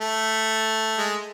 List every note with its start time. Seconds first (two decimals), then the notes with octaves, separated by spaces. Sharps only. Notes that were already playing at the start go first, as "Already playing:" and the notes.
0.01 A3
0.98 G#3